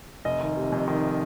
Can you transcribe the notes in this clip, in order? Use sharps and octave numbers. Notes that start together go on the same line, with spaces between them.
F1 D#5
D#3
C3
F2
D#3